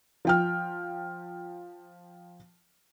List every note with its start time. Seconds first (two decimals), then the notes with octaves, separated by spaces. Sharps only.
0.25 F3 G5 F6